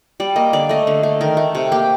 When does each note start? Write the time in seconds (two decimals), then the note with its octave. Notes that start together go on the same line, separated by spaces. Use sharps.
0.20 G3 D5
0.36 A#3 D#5
0.53 D3 D5
0.69 A3 D#5
0.87 D3
1.03 A3
1.21 D#3 A#4
1.37 A3
1.55 C3
1.72 A#3 G4